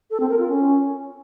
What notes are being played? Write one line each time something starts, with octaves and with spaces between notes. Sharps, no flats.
A4
C4
A#4
F4
C#4